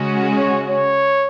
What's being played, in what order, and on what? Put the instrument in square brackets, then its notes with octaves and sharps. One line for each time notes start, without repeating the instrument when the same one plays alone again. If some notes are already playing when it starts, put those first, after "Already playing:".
Already playing: [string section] C#3 G#3 C#4 F#4
[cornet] C#5
C#5